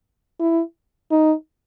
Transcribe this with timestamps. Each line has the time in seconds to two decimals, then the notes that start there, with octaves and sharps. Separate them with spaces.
0.40 E4
1.11 D#4